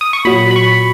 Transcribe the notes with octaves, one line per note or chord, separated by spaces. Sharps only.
D#6
C#6
A#2 F#3 B5
B5
C#6